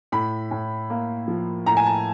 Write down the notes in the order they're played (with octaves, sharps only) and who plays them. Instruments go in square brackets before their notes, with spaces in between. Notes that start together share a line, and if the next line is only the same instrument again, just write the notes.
[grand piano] A2 B5
A2
A#3
F3
A2 A#5
G#5
A5